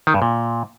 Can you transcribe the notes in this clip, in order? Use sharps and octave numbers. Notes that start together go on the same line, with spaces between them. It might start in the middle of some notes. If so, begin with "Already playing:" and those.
D#3
G2
A#2